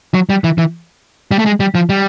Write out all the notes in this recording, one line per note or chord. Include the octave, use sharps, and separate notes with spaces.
F#3
G3
E3
E3
G3
A3
G#3
G3
F3
G3